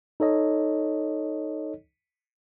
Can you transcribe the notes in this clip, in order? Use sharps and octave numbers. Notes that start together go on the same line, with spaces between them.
D#4 A4 C#5 D#5